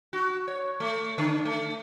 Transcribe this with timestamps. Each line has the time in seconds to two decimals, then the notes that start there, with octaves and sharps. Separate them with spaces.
0.13 F#4
0.48 C#5
0.80 A3
1.18 D3
1.45 A3